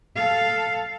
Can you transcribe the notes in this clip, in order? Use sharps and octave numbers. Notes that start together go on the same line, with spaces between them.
A4 F5